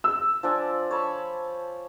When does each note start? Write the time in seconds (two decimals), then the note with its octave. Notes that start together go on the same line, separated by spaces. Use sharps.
0.04 E6
0.43 F3 D4 G#5
0.91 C#5 A5 B5